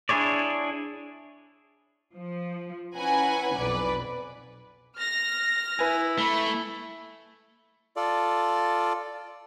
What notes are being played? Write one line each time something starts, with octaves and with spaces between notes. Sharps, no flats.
D4 E4 G#4 C#5 D5
F3
C#4 E4 B4 F#5 G#5 A#5
B1 F2 B4 D5
F6 A#6
E4 B4 G#5
A3 B5 G7
F4 A4 D5